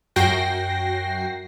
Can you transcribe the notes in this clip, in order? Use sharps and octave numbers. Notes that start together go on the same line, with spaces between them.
F#2 F#4 G5 A#6 C7